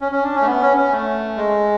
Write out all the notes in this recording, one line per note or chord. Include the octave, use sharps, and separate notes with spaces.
C#4
C#4
D4
C#4
A3
B3
C#4
C#4
A3
G#3